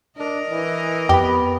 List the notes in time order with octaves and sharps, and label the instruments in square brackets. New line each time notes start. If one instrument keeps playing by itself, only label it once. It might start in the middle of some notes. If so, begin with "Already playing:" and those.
[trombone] D4 [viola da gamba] A#4 D#5
[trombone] E3
[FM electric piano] F2 B5 [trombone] B3 [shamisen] G4